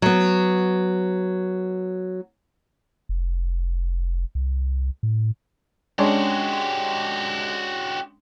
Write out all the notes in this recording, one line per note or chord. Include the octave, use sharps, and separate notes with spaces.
F#3 B3
F1
C2
A2
G#3 C#4 D4 F#4 G4